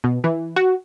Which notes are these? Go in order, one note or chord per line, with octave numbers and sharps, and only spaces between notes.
B2
E3
F#4